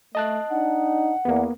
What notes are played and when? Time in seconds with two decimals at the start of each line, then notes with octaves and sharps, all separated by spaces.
0.15 A3 D#5 A5 F#6
0.50 D4 D#4 F#5
1.25 E2 A#3 B3